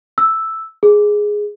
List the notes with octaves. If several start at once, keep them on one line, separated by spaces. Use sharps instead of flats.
E6
G#4